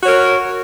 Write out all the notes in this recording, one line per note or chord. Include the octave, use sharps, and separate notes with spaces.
F#4 A#4 C#5